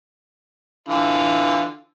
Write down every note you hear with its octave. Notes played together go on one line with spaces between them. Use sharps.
D3 E3 F4